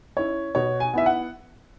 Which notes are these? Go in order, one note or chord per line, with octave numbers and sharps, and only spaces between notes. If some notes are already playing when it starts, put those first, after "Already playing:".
C#4 E4 C#5
B2 C#5
G#5
B3 E4 E5
F#5